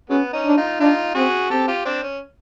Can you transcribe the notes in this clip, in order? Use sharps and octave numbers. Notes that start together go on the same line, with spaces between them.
F#3 G#3 B3 C#4
C#4 D#4
D4
D#4 F4
D4 D#4 F4
C4 F#4 G#4
C4 G4 A4
F4 G4
C4 D4
C#4